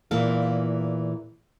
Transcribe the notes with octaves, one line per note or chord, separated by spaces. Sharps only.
E2 A#2 E3 F5